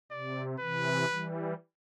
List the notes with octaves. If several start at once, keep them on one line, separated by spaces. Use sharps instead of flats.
C3 D5
C3 E3 B4
E3 G3